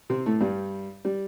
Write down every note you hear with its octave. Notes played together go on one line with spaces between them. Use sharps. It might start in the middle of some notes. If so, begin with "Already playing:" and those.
C3 C4
A2 A3
G2 G3
G3